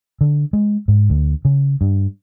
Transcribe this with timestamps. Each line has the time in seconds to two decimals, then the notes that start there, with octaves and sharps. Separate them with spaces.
0.21 D3
0.53 G#3
0.88 G#2
1.10 D2
1.45 C#3
1.81 G2